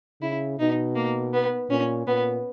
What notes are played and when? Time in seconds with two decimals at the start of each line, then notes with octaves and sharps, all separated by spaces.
0.21 C#3 E4
0.59 B2 D#4
0.96 A#3
1.33 B3
1.70 A#2 C#4
2.07 A#2 B3